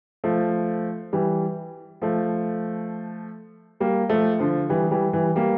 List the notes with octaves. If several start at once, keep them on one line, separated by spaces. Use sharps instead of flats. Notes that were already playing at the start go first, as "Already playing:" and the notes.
F3 A3
E3 G3
F3 A3
G3 A#3
F3 A3
D3 F3
E3 G3
E3 G3
E3 G3
G3 A#3